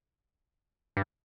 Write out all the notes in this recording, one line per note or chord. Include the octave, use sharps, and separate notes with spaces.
G2